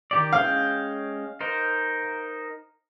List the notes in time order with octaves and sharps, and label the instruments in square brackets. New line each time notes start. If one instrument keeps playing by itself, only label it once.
[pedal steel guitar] D#3 G4 D5
[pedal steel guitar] G#3 C#4 G5 [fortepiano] F5
[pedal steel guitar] D#4 A#4 C5